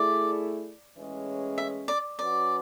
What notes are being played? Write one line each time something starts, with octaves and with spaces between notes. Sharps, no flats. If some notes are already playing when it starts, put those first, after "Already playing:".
Already playing: A3 E4 G#4 D5
A2 E3 G#3 C#4 G#4
E5
D5
F#3 C#4 F#4 B4 D5